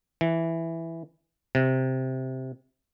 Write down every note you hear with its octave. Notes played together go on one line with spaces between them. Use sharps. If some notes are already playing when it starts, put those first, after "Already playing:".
E3
C3